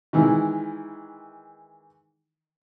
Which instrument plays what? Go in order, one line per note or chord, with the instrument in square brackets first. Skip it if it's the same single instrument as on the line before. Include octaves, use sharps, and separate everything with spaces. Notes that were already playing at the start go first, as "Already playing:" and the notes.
[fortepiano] D#3 E3 G#3 E4